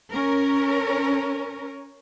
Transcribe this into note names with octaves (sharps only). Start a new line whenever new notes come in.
C#4 A#4